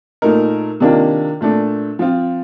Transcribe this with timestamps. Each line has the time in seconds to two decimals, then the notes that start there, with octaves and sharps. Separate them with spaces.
0.22 A#2 A3 D#4 A#4
0.80 C3 D#3 A#3 D4 F4
1.41 A#2 A3 D4
1.99 F3 C4 F4